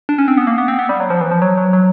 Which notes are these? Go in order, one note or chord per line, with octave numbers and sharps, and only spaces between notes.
D4
C#4
C4
B3
A#3
B3
C4
B3
G3
F#3
F3
E3
F3
F#3
F#3
F#3